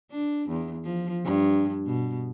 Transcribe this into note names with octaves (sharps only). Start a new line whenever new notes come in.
D4
E2
F3
G2
B2